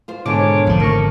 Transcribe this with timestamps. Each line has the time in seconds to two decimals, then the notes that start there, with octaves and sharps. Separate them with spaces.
0.08 F4 C5
0.26 G#2 B2 D3 D#3 D4 C#5 D6
0.67 G#1 D3 F3 F4
0.80 A3 A#4 C#6